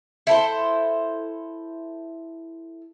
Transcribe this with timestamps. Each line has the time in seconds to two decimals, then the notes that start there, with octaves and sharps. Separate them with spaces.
0.27 E4 A4 C5